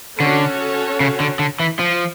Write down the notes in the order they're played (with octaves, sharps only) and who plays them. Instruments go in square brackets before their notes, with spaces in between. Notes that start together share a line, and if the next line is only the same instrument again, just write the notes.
[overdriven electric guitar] D3 [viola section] C#4 F#4 A4 C#5
[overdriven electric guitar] C#3
D3
D3
E3
F3